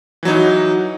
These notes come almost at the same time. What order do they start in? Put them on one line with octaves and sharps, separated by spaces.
E3 F#3 D#4